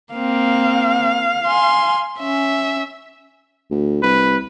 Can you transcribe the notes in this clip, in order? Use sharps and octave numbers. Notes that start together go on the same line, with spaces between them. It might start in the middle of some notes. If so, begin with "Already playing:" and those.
A#3 C4 F5
G#5 C6
C#4 E5
D2
C2 B4